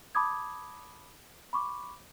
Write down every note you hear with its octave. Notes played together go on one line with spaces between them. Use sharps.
A5 B5 D6 D#6 G#6
B5 C#6 D6